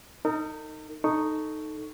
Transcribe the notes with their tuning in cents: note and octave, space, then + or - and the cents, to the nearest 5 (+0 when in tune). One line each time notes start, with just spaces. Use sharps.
D#4 +0 A#4 -45
D#4 -5 A4 +0 C#6 +0